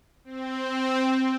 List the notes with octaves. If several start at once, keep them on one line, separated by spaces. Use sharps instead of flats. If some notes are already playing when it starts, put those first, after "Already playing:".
C4